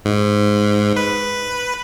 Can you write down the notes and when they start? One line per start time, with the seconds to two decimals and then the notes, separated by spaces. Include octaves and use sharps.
0.05 G#2
0.96 B4